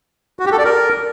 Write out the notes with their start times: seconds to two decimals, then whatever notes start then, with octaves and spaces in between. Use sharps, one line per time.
0.39 F#4
0.46 G4
0.52 A4
0.58 D5
0.65 A#4